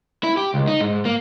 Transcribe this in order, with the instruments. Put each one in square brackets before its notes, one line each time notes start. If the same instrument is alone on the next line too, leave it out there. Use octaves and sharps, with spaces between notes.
[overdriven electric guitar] E4
G4
C#2
D#4
G#2
A#3